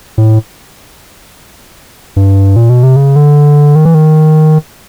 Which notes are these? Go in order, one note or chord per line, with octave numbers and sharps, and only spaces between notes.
A2
G2
A#2
B2
C3
C#3
D3
D#3
E3
D#3